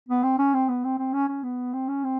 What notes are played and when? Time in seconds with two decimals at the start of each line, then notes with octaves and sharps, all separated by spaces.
0.08 B3
0.23 C4
0.38 C#4
0.54 C4
0.69 B3
0.84 C4
0.99 C4
1.13 C#4
1.28 C#4
1.43 B3
1.73 C4
1.88 C#4
2.04 C4